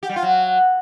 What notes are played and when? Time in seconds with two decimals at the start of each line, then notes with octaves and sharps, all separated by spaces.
0.03 G4
0.09 G3
0.16 F4
0.23 F#3